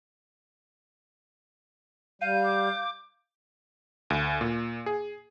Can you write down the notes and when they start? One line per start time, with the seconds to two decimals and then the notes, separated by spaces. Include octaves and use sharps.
2.21 G3 F5 G6 D#7
2.44 D6
4.10 D2
4.41 A#2
4.86 G#4